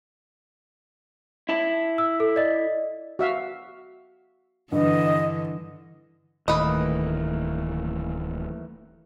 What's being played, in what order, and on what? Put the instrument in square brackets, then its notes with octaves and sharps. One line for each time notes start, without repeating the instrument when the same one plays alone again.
[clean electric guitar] E4 A5
[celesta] E6
A4
D5 D#5
[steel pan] F#4 E5 F5
[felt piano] G2 B4 [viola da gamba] D3 E3 [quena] D#5
[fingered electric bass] D1 D#3 [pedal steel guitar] E3 A3 A#3 [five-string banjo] B4 D#5